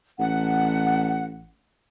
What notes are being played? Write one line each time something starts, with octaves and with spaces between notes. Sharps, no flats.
A1 F#5